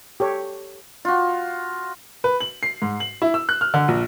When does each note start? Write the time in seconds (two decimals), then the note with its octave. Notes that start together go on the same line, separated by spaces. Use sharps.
0.20 G4 A4 C#5
1.05 F4 F#4
2.24 B4
2.40 F#7
2.63 C7
2.82 G#2
3.00 F#7
3.22 E4
3.34 E6
3.49 F#6
3.61 F6
3.74 D3
3.88 A#1